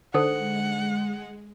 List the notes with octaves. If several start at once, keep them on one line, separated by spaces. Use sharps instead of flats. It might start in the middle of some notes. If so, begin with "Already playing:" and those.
D3 G#3 D#4 A4 C5 F#5